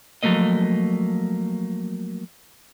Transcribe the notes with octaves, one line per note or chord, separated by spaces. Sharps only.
F3 F#3 A3 A#3 D#5